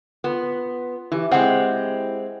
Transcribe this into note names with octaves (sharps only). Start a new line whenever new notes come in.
B3 F4
E3 E4 G4
G#3 C4 F#5 G5